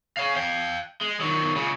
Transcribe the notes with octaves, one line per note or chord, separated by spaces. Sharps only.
C#5 F5
F5 G5
G#3
D#3 F#3
C#2 C#3